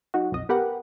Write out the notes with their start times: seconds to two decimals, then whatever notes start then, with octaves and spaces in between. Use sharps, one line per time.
0.14 F#3 D#4 F#4
0.32 B1 F2 D#5
0.49 B3 G4 A#4 B4 F#5